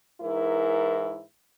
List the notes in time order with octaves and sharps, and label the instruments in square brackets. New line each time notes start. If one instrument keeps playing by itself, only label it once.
[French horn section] G#2 E3 E4 A#4